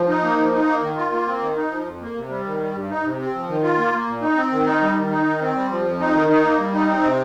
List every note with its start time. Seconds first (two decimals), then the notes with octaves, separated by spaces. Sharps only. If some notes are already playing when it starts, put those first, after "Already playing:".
Already playing: F3
0.08 D#4
0.23 A#3
0.38 F3
0.53 D#4
0.67 A#3
0.82 D#3
0.97 F4
1.12 A#3
1.27 C4
1.41 D#3
1.56 D#4
1.70 F3
1.85 F2
2.01 A#3
2.16 C3
2.29 G3
2.45 D#3
2.60 G3
2.74 G2
2.90 D#4
3.04 C3
3.19 C4
3.34 F3
3.48 D#3
3.63 F4
3.77 A#3
3.93 A#3
4.07 A#2
4.22 D#4
4.36 C4
4.52 D#3
4.66 D#4
4.81 G3
4.97 D#3
5.10 D#4
5.25 D#3
5.41 C4
5.55 G3
5.71 F3
5.85 F2
6.00 D#4
6.14 D#3
6.29 D#4
6.44 A#3
6.58 G3
6.74 D#4
6.88 C4
7.03 C3